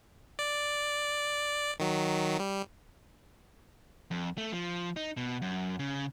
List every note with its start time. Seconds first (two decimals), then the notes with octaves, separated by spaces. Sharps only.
0.39 D5
1.80 D#3 F#3
2.40 G3
4.11 F2
4.38 A3
4.52 F3
4.96 D#4
5.17 B2
5.42 F#2
5.79 C#3